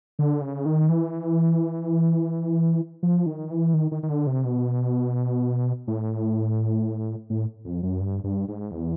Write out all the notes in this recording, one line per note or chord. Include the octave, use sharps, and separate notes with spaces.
D3
C#3
D#3
E3
F3
D#3
E3
D#3
D#3
D#3
D3
C3
B2
A2
A2
F2
F#2
G2
G2
G#2
E2